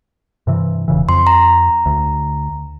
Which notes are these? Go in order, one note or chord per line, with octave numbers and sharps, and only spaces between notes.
G2 C3 E3
E1 C#3 E3
F2 C6
A#5
D2